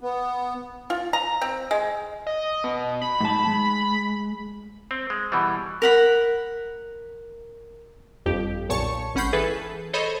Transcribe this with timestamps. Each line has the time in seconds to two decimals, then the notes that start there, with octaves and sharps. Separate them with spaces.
0.01 B3
0.90 F4
1.13 A#5
1.42 C4
1.71 G#3
2.27 D#5
2.64 B2
3.02 B5
3.20 G#2 A5
3.47 G#3
4.91 C4
5.10 G#3
5.32 B2 E3 G3
5.82 A#4 F#5 B5
8.26 G1 F2 G4
8.69 B1 A#2 C#5 A5 C#6 C#7
9.15 G#1 C#4 F#5 B5 G6 C7
9.33 E3 G#4 A4 B4
9.93 A4 C5 C#5 D#5 B5